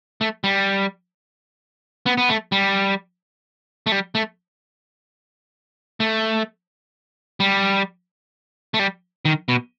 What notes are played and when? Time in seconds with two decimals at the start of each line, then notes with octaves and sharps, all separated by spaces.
0.21 A3
0.44 G3
2.06 B3
2.18 B3
2.29 A3
2.52 G3
3.87 A3
3.92 G3
4.15 A3
6.00 A3
7.40 G3
8.74 A3
8.79 G3
9.25 D#3
9.49 B2